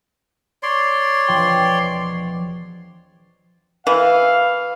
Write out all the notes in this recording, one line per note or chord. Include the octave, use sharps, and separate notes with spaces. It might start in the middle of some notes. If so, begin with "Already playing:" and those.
C#5 D5 C6
E1 F3 G5
E3 F5